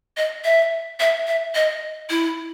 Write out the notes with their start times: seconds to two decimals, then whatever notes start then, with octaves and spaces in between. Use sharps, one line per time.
0.17 D#5
0.45 E5
1.00 E5
1.27 E5
1.55 D#5
2.10 E4